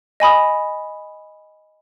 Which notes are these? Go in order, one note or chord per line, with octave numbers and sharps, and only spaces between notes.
D#5 G#5 B5 D#6